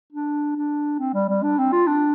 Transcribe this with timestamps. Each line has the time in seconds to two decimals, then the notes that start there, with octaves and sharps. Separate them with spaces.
0.12 D4
0.56 D4
0.99 C4
1.14 G3
1.29 G3
1.43 D4
1.58 C4
1.72 F4
1.87 D4